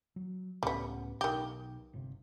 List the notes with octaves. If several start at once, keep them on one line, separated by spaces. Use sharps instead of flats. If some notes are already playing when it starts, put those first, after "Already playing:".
F#3
C#2 A2 G3 B3 C#4
B1 D#3 G4
G1 C3